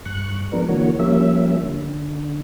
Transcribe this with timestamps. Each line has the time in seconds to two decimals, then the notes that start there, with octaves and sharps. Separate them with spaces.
0.06 G2 C#6 F#6
0.52 F3 G#3 B3 D4 A#4
0.69 D3 E3 A#3 F#4 C#5
0.99 F3 G3 A#3 C#4 E5
1.63 D3